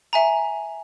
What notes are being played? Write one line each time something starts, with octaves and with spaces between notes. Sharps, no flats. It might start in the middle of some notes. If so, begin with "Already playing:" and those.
E5 G#5 A#5